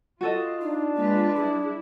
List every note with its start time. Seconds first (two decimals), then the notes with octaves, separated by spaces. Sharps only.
0.21 F4 F#4 A4 D#5
0.61 D4 D#4
0.96 G#3 A#3 F4 B4
1.36 G3 E4 G#4